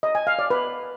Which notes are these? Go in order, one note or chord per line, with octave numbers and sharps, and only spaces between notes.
D#5
G#5
F5
D5
B4